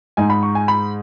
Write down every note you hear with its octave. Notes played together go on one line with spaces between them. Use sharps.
G#2 G#3 D#4 G#5
B5
C#6
G#5
B5